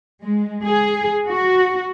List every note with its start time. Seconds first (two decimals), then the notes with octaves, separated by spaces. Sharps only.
0.22 G#3
0.63 G#4
1.27 F#4